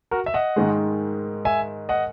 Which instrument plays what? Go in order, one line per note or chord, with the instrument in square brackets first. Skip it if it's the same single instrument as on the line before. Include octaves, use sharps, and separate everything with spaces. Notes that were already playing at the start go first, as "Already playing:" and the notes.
[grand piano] F#4 A#4
E5
D#5 F#5
[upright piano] G#2 D#3 G#3
[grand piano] E5 G#5
D#5 F#5